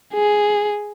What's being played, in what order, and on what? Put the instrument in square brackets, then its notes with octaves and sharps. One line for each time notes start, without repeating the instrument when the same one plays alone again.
[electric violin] G#4